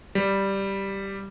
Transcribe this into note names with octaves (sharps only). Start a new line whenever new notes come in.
G3